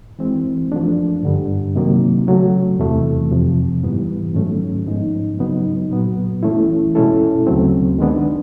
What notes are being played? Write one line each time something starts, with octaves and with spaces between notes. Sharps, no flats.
E3 G#3 C4
F3 A3 D4
G2 D3 G3
C3 D#3 F#3 A#3
C#3 F#3 A3
E2 C3 E3 A3
F2 C3 F3
G#2 E3 G3 B3
G#2 D#3 F#3 A3 C#4
G#2 F3 G#3 B3 D#4
C#3 F#3 B3 D#4
A#2 F#3 B3
E3 A3 C#4 E4
B2 G#3 C#4 E4 A4
D2 C#3 F#3 A3 C4
D#3 G#3 B3 D4